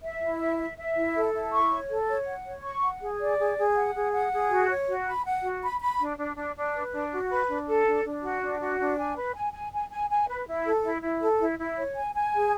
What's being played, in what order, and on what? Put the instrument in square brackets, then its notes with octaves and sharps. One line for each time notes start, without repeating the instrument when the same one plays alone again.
[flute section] E5
E4
E5
E5
E5
E4
A4
E4
C#6
C#5
A4
C#5
F#5
C#5
C#6
F#5
G#4
D5
G#4
G#4
F#5
G#4
F#5
G#4
F#4
C#5
F#4
B5
F#5
F#4
B5
B5
D4
D4
D4
D4
B4
D4
F#4
B4
D4
A4
D4
D4
F#4
D4
F#4
D4
G#5
B4
G#5
G#5
G#5
G#5
G#5
B4
E4
A4
E4
E4
A4
E4
E4
C#5
G#5
G#5
G#4